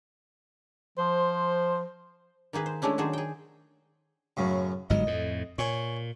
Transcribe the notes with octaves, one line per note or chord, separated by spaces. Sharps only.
F3 C5
D#3 A#3 G#4 B4
C5
G#3 A3 C#4 D4 E4
D#3 F#3 D4 G#4 C5
G#4 G5
F#2 A2 C#3
G1 G#2 F#3 D#5
F2 A2
A#2 C#5 G#5 C#6